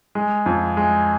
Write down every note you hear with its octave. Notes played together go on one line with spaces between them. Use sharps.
G#3
F2
G#3